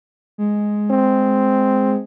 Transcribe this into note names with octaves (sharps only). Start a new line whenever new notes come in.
G#3
C4